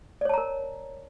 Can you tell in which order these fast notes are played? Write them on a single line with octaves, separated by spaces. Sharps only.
D5 C#5 A5 A#5 A#4